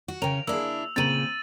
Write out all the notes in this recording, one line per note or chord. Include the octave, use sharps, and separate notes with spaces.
F#4
C#3 C#4 A#4 G5 F7
A#3 D4 E4 G#4 E6
A#2 C#3 C4 A#4 A6 D#7 F#7